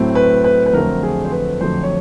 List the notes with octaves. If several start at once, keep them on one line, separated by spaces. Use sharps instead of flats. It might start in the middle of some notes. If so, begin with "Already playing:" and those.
Already playing: A2 F#3 A3 C4
B4
B4
B4
F2 D3 F#3 A3 C4 A#4
G#4
C5
B4
F2 D3 F#3 A3 C4 C5
C#5